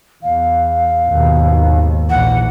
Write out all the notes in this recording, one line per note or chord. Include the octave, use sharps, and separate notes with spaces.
E2 F5
D#2 G#2 B2
A#1 E3 F#5